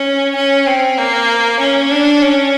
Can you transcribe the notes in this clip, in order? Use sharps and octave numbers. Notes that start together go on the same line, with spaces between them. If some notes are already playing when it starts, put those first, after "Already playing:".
Already playing: C#4
C#4
C4
A#3
C#4
D4
C#4